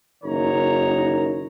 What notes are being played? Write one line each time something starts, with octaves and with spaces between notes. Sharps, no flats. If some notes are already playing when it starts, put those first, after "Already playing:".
F#1 D#3 D#4 A#4 C#5 A#5